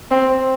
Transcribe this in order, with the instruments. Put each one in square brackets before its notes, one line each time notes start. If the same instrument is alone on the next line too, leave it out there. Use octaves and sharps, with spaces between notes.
[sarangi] C4